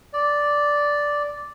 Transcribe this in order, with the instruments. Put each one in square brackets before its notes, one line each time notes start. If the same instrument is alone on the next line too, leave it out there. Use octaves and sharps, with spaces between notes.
[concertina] D5